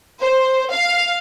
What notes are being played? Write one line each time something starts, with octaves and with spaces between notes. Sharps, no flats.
C5
F5